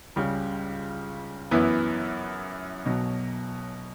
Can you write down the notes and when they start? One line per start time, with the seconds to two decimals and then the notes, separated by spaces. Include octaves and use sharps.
0.16 C#2 C#3 G3
1.51 F#2 E3 B3 E4
2.86 B1 B2 F#3